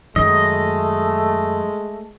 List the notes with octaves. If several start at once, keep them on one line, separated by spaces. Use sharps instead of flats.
F#2 D#3 G#3 A3 D#5